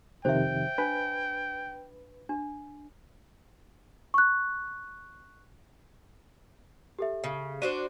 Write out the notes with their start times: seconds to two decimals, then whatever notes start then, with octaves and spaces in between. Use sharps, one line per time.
0.25 F2 C3 D#3 C5 E5 G5
0.78 D4 B4
2.29 D4
4.14 C#6 F#6
6.99 G4 A4 E5
7.24 C#3
7.62 D4 F#4 C5 D#7